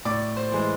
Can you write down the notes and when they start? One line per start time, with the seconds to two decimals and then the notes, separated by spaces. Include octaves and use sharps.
0.05 A2 D5 D6
0.36 C5 C6
0.52 E3 G#3